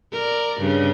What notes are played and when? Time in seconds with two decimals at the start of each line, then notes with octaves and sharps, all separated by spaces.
0.12 A#4 D5
0.60 G2 C#3